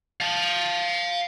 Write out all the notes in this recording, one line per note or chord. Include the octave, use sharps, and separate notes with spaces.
F5 A5